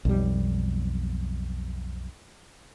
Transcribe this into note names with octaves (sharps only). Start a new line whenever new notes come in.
B1 F2 G3